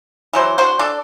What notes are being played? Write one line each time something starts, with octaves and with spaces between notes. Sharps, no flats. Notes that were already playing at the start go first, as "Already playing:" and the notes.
E3 F#3 C5
D4 F#4 C5
D4 A4 D5